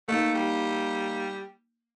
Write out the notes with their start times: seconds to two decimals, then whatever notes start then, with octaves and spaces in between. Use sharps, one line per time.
0.08 A3 A#3 D#4
0.35 G3